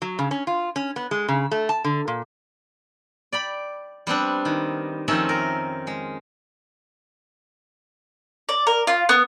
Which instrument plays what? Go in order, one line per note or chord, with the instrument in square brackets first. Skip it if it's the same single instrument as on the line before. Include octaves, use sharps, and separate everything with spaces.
[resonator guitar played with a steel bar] F#3
C#3
C#4
F4
C#4
B3
G#3
C#3
A3
A5
D3
A#2
[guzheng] D5 G5 B5
G3 B3 C4 D4
D#3
F2 D#3 A3 C4 C#4 E5
A#4
G#3
[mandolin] D5
A#4
F4
B3